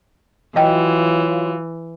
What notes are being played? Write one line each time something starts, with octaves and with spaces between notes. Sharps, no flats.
E3 F#3 F4 D#5 G5